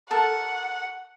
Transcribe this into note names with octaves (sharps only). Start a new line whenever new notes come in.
A4 A#4 F#5 A5